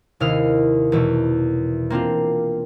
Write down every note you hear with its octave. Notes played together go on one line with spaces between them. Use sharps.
D#2 C3 E4 F5 D#6 F6
E2 B2 A3
A#3 C4 D4 F4